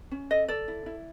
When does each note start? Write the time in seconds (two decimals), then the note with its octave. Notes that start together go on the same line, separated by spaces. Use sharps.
0.11 C#4
0.30 A4 D#5
0.48 A4 D5
0.68 E4
0.86 E4